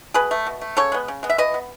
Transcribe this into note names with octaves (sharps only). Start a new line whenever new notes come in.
B2 G#4 B4
A3
B2
A3
C#3 A4 C#5
G#3 B3
C#3
G#3 B3
E5
E3 B4 D#5
B3